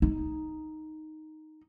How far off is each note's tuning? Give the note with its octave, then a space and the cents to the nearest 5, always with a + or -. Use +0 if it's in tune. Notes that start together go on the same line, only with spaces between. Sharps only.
D#4 +0